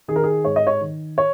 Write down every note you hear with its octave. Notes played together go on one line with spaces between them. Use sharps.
D#3 G#4
A#4
G#4
G#2 C#5
D#5
C#5
D#3
C#5